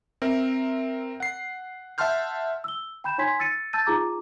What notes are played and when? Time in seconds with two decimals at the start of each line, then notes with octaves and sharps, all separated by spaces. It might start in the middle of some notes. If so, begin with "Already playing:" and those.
0.22 C4 A#4 E5
1.20 F#5 C7
1.98 E5 F#5 A5 C6 F6 G6
2.64 E6 G7
3.04 G5 B5 G6 E7
3.18 D#4 C#5 G#5 C6 G#6 B6
3.39 E6 A6 C#7 D#7
3.73 A5 E6 G6 A6 D#7
3.86 D#4 F4 G#4 A#5 D6